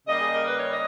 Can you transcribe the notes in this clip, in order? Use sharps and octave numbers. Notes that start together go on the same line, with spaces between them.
C#3 G3 A#3 D#5
G#4
A#4
B4
C#5
D#5